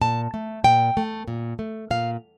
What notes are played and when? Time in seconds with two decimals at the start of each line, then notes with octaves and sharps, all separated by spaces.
0.01 A#2 A5
0.34 A3
0.64 A#2 G5
0.97 A3
1.28 A#2
1.59 A3
1.91 A#2 F5